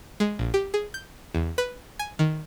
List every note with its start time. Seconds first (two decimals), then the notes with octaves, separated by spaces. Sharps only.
0.20 G#3
0.39 A#1
0.54 G4
0.74 G#4
0.94 G6
1.34 E2
1.58 B4
1.99 G#5
2.19 D#3